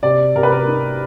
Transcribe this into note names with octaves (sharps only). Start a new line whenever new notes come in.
C3 D5
C3 A#4
B4
A#4
D#4